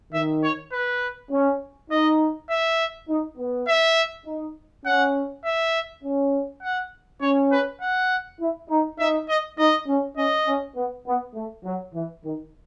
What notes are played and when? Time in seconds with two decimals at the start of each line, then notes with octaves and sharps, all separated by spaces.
0.13 D#3 E5
0.43 C#5
0.72 B4
1.31 C#4
1.90 D#4 D#5
2.50 E5
3.09 D#4
3.38 B3
3.68 E5
4.26 D#4
4.86 C#4 F#5
5.45 E5
6.04 C#4
6.62 F#5
7.21 C#4 C#5
7.52 B4
7.81 F#5
8.40 E4
8.69 D#4
8.99 D#4 E5
9.29 D#5
9.58 D#4 D#5
9.88 C#4
10.17 C#4 D#5
10.47 C#4
10.76 B3
11.06 B3
11.35 A3
11.65 F#3
11.94 E3
12.24 D#3